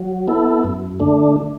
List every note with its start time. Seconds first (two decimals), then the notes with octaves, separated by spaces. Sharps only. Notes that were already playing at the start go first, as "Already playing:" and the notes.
Already playing: F#3
0.28 B3 E4 A4
0.64 F#2
1.00 D3 A3 D4